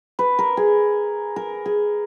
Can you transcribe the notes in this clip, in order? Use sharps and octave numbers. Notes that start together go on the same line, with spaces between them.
B4
A#4
G#4
A#4
G#4